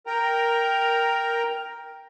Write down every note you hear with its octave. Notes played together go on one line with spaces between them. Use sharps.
A#4 G5 A#5